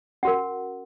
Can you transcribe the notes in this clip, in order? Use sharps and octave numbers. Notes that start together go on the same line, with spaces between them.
C#4 F#4 A#4 F#5